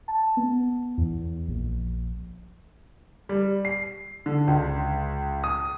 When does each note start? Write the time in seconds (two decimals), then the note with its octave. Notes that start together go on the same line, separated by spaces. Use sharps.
0.08 A5
0.37 B3
0.98 E2
1.48 A#1
3.29 G3
3.65 C7
4.26 D3
4.47 C#2
5.44 D#6